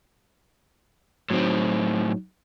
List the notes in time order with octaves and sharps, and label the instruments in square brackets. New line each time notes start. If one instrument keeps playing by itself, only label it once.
[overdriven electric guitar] A2 C4 [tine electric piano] F#3 D#4